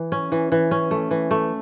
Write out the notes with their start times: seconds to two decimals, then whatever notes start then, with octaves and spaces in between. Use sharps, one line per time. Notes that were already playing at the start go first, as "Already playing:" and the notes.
Already playing: E3
0.12 C#4
0.32 E3
0.52 E3
0.71 C#4
0.91 A3
1.11 E3
1.31 A3